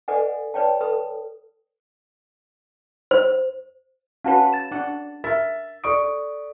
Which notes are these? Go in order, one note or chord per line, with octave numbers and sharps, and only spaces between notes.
A4 B4 D5 D#5 F#5 G#5
B4 C#5 D5 G5 A5
A4 B4 B5 D#6
C5
C#4 F#4 B4 F5 F#5 A5
A6 E7
D4 F#5
A#4 E5 A6
A4 D5 C#6 D#6 D7